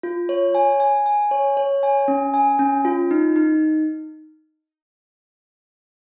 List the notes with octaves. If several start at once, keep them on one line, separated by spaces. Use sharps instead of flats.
F4
C#5
G#5
G#5
G#5
C#5
C#5
G#5
C#4
G#5
C#4
F4
D#4
D#4